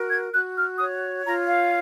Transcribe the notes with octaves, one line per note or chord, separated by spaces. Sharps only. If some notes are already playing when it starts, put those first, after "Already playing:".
Already playing: F#4 A#4
G#6
F#4 F#6
F6
C#5 D#6
F4 A#5
F5